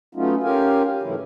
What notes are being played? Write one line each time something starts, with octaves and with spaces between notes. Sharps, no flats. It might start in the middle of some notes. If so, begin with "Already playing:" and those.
F#3 A3 B3 C#4 D#4 F4
C#4 F4 G4 A#4 F5 G#5
G#2 C#3 E3 F#3 A3 E4